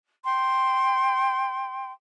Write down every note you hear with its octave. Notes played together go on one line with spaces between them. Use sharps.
G5 C6